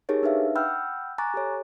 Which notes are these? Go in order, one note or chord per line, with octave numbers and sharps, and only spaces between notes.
D#4 G4 G#4 A#4 C#5 A6
D4 D#4 B4 E5 F5
F#5 G5 B5 E6 F6 G6
G#5 A#5 C#6 D6 F#6 A6
G4 A4 C#5